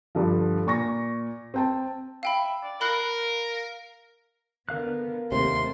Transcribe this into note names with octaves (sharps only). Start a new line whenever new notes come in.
G2 D3 F3
A#2 C#6 A#6
C4 G5 A5
E5 F5 G5 B5
D5
A#4 F5 B5 F#6 C7
D3 B3 A#4 F5 F#6
D#2 C3 A3 C4 C6